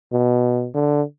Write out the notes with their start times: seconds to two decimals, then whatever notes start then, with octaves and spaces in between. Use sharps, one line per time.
0.12 B2
0.74 D3